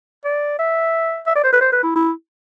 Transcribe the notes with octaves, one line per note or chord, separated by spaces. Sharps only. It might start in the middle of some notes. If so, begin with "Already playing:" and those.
D5
E5
E5
D5
C5
B4
C5
B4
E4
E4